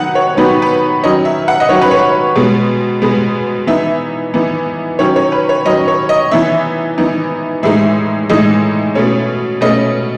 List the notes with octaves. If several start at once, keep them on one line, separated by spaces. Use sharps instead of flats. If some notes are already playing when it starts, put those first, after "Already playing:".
Already playing: D#3 F#3 B3 D#4 F#5
C#5
D#3 F#3 B3 D#4 B4
B4
D#3 F#3 C#4 D#5
E5
F#5
D#5
D#3 F#3 C#4 C#5
B4
C#5
B2 G#3 B3
B2 G#3 B3
E3 B3 D#4 E5
E3 B3 D#4
D#3 F#3 C#4 C#5
C#5
B4
C#5
D#3 F#3 C#4 D#5
C#5
D#5
E3 B3 D#4 E5
E3 B3 D#4
A2 E3 G#3 D#4 E5
A2 E3 G#3 D#4 D#5
B2 A3 C#4
B2 A3 C#4 D#5